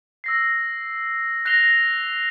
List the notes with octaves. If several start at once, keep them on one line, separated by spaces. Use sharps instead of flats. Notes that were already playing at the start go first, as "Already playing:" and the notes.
E6 A#6 C7
F#6 A#6 C7 F7 G7